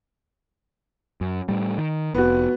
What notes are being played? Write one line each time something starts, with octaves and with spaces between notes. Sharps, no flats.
F#2
A2 G3
D#3
F1 B3 F#4